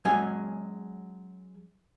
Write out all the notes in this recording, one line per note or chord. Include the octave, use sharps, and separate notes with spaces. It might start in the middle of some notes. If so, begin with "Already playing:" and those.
F#3 G#3 C#4 G#5